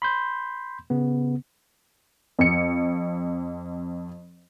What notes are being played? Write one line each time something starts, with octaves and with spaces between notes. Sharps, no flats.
B5 C6 G6
C#3 B3
F2 C#7